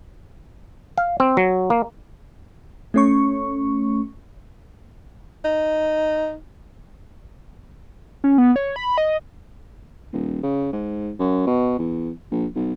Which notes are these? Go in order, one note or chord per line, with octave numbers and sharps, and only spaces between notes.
F5
C4
F#3
A#3
A3 C#4 C#6
D#4
C#4
B3
C#5
B5
D#5
D#1
C#3
G#2
F#2
B2
E2
A#1
B1